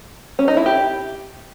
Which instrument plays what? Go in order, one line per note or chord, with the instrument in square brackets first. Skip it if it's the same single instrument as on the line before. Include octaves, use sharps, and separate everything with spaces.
[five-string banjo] C#4
D#4
E4
G4